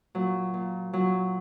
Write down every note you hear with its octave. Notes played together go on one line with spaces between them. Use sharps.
A#2 F#3
A#2
A#2 F#3